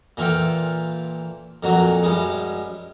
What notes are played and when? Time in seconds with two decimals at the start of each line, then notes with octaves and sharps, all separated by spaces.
0.17 A#2 E3 F4 A4 G5
1.63 F2 A#2 F#3
2.03 F#2 G3 G#3